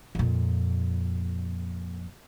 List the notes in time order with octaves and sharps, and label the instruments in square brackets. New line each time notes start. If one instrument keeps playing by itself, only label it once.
[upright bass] F2 A#2